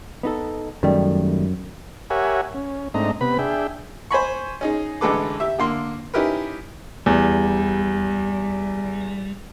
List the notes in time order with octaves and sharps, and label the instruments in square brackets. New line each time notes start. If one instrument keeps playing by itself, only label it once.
[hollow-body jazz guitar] B3 D#4 A4
[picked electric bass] F#2 [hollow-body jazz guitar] D#3 G3 A3
[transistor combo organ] G4 A#4 C#5 E5 F#5 G#5
C#4
G#2 A3 C4 D4 D#5 A#5
C3 B3 B4 B5
D4 G#4 E5 G5
[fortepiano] C5 G#5 B5 C#6
C#4 D#4 G#4
A1 D3 G#3 A4 B4 D6
G4 E5
D3 A#3 C6
C#4 D#4 E4 G4 A#4 B4
[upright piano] E2 [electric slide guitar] G3